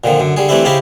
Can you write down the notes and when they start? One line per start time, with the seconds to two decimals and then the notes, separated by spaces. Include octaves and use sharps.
0.04 A#2 D3 D#3 F3
0.20 F#2 D3
0.36 D3 G3 G#4
0.49 E3 G3 A3 C4 D4 E4
0.65 C#3 C#4 D#4 E4 G4 C5